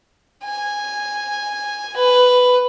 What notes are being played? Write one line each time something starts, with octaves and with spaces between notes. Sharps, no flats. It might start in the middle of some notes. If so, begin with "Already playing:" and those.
G#5
B4